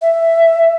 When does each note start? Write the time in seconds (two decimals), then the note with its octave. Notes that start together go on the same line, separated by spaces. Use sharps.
0.02 E5